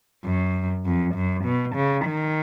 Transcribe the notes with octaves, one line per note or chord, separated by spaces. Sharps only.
F#2
F2
F#2
B2
C#3
D#3